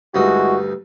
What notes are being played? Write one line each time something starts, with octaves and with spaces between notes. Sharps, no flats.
D2 G2 G#3 D#4 E4 F#4